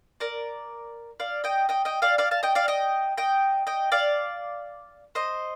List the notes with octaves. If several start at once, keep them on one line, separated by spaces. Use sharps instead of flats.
A#4 D5
D5 F5
D#5 G5
D#5 G5
D#5 G5
D5 F5
D5 F5
F5 A5
D#5 G5
D5 F5
D#5 G5
D#5 G5
D#5 G5
D5 F5
C5 D#5